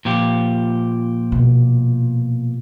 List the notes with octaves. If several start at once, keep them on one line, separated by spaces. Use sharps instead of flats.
A#2 F3 G4
B2